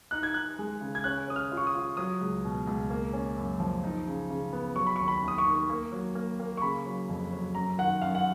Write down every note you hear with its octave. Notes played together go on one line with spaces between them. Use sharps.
D#4 F#6
G#6
D#4 F#6
G#3
C#3
G#6
C#4 F#6
C#4 D#6
F6
F4
C#6
D#6
F4
F#3 D#6
C#2
B2
C#2
A#3
C#4
F#2
F3
D#4
C#3
C#3
B3
F#3 C#6
B5
C#6
D#2
B5
D#2
D#6
C#6
D#3
A#3
F#3
A#3
A#3
C#6
C#3 B5
F#3
F2
F#3
F#2 A#5
D#3 F#5
F#2 F5
F#5